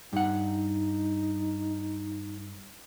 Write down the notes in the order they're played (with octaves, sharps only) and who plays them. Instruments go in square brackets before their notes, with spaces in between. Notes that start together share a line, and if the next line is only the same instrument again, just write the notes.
[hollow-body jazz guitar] G2 F#5 [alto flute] D#4